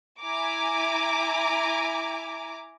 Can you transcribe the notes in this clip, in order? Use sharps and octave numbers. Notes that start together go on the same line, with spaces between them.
E4 G#5 A#5 D6